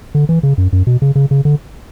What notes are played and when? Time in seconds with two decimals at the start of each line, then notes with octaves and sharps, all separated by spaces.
0.15 D3
0.29 E3
0.43 C#3
0.58 F#2
0.73 F#2
0.87 B2
1.02 C#3
1.15 C#3
1.31 C#3
1.45 D3